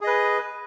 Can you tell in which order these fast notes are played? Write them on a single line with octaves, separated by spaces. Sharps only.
G#4 D#5 B4